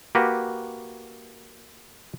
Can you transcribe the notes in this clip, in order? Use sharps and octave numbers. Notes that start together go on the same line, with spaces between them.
A#3 F#4 G4 B4